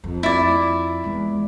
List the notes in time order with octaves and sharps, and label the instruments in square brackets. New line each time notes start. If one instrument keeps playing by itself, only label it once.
[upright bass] F2
[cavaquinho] E4 D5
[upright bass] E2 G#3